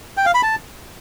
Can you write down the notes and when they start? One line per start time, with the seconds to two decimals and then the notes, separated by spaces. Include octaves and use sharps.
0.17 G5
0.26 F5
0.34 B5
0.43 A5